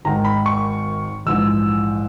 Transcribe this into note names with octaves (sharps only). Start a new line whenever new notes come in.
G#1 G#2 D#3 A#5
B5
C#6
A#1 G#2 E3 E6